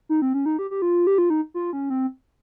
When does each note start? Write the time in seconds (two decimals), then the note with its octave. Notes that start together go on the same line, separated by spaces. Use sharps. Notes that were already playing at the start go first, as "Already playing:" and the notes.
0.09 D#4
0.22 C4
0.34 C#4
0.46 D#4
0.59 G4
0.71 G4
0.82 F4
1.07 G4
1.18 F4
1.30 D#4
1.54 F4
1.73 C#4
1.90 C4